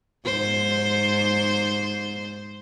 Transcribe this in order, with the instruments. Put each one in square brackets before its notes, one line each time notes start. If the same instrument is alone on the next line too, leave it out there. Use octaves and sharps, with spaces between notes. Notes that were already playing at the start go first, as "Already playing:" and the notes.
[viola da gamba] G#2 C5